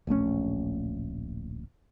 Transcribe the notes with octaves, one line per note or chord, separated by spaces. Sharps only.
D1 A#1 A3 C#4